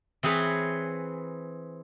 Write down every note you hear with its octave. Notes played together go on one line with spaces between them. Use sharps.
E3 C4 G#4 B4 C#5